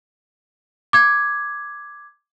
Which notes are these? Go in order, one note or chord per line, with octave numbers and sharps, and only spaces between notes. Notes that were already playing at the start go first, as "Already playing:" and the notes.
D6 G#6